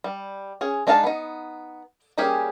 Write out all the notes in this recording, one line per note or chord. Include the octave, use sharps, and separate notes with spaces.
G3
C#4 G#4
G#3 D4 D#4 F5 A5
B3 D#4
G3 A#3 C#4 G4 G#4